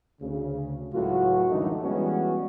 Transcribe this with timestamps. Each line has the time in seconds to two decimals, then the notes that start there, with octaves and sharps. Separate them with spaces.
0.21 D2 C#3
0.92 C#2 A2 F#3 F4 F#4
1.49 F#2 D3 E3 G3 A3 D#4
1.82 E3 G3 G#3 B3 C#4 F#4